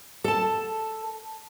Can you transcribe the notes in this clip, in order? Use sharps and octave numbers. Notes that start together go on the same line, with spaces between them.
A4 A5